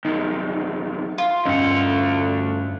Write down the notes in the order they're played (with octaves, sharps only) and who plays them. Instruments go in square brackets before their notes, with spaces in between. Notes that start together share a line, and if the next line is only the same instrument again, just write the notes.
[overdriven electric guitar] C2 F#2 [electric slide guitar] D#4
[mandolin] F4
[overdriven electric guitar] D2 F#5 [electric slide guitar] G2 C#4 D#5